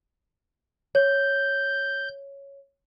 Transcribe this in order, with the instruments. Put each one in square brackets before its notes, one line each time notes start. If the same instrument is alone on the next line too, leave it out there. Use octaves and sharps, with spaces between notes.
[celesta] C#5 [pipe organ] G6